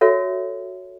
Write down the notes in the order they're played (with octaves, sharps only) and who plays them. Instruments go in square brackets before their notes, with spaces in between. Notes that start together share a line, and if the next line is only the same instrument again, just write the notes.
[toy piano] F#4 A4 C#5 E5